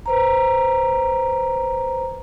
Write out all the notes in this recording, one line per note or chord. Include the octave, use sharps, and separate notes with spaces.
B4 C5 A#5